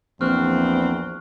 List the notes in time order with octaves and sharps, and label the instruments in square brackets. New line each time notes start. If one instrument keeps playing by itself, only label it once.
[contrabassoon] A#1 [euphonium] E2 [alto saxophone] C4 [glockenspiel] C#6 F6 F#6